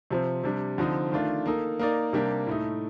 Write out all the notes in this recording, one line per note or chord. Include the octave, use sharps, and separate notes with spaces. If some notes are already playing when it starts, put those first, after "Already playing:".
C3 F3 C4
C3 G3 D4
D3 F3 C4 D#4
D#3 A3 D4 F4
A#3 D#4 A4
A#3 D#4 A#4 D5
C3 G3 A#3 D4 G4
A2 A3 D#4